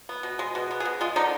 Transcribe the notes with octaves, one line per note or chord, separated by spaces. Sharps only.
B3
B2
G#3
B2
B3
G#4
B2
G#3 F4
D3 D#4